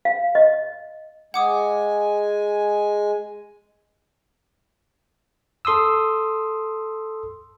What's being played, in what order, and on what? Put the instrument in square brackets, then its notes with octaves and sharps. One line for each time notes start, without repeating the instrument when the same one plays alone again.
[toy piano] F5
D#5
[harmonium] G#3 G#5 [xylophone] F#5 D6 D#6
[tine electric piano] A4 C6 D#6 E6